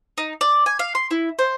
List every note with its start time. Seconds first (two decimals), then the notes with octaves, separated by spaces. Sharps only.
0.18 D#4
0.41 D5
0.66 G#5
0.79 F5
0.95 C6
1.11 E4
1.39 C5